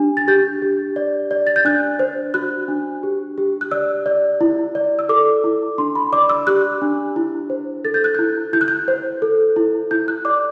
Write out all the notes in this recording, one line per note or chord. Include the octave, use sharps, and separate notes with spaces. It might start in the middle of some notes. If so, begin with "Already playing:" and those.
Already playing: D4 G4
A6
G4 G6
G4
D5
D5
A6
G6
D4 F#6
C5
F#4 F#6
D4
G4
G4
F#6
D5 E6
D5
E4
D5
E6
A4 D6
E4
D4 C6
B5
D5 D6
E6
G4 F#6
D4
E4
C5
A4 A6
G6
F#6
E4 G6
E4 G6
F#6
G6
C5
A4
E4
E4 G6
F#6
D5 D6